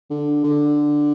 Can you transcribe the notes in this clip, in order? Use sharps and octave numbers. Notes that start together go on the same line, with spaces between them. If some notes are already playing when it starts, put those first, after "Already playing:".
D3
D3